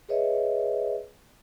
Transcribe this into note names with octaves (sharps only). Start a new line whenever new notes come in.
G#4 B4 C#5 D#5 E5